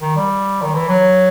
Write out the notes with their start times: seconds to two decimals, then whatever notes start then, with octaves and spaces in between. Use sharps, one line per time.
0.01 D#3
0.16 G3
0.62 D#3
0.74 E3
0.88 F#3